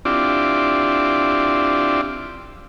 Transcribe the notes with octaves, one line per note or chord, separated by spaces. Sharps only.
C4 D4 E4 F4 G4 D5